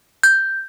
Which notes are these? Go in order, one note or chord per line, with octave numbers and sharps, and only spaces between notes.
G6